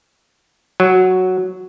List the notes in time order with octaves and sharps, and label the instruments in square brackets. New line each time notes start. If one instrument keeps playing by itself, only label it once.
[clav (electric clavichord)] F#3